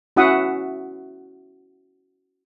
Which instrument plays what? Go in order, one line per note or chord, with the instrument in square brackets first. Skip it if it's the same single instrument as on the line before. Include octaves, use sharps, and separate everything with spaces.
[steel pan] C#4 E4 F#4 E5 F#5 D#6